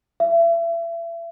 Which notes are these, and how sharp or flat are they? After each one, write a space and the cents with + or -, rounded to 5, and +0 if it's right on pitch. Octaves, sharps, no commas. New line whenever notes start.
E5 +35